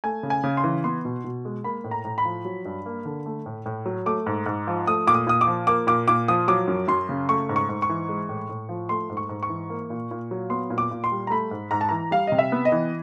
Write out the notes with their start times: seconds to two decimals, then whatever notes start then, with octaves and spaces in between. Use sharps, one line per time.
0.04 A3 G#5
0.23 C#3
0.30 G#5
0.44 C#3
0.57 C6
0.64 E3
0.84 B3 C6
1.05 B2
1.24 B2
1.45 G#3
1.64 A#3 B5
1.84 A2
1.91 A#5
2.05 A2
2.18 B5
2.25 F3
2.45 F#3
2.65 G2
2.86 A#3
3.05 D3
3.26 A3
3.46 A2
3.66 A2
3.86 F#3
4.06 A3 D6
4.26 G#2
4.46 G#2
4.67 F3
4.87 A3 D#6
5.07 A#2 D6
5.14 D#6
5.27 A#2 D#6
5.41 D6
5.47 F3
5.67 A#3 D6
5.87 A#2 D6
6.08 A#2 D6
6.28 F3 D#6
6.48 F#3 D6
6.68 F#2
6.88 F#2 C6
7.09 C#3
7.29 A3 C#6
7.49 G#2
7.56 C#6
7.69 G#2
7.82 C#6
7.89 E3
8.09 G#3
8.29 A2
8.49 A2
8.69 F3
8.89 A3 C6
9.10 G#2
9.17 C#6
9.29 G#2
9.43 C#6
9.49 E3
9.70 A#3
9.90 A#2
10.11 A#2
10.31 F#3
10.50 B3 C6
10.70 A#2
10.78 D6
10.91 A#2
11.04 C6
11.12 G3
11.27 A#5
11.30 A3 B5
11.51 G#2
11.71 G#2 A#5
11.81 A5
11.89 E3 A#5
12.11 G3 F5
12.27 C3 D#5
12.39 E5
12.52 B3
12.65 D#5
12.72 E3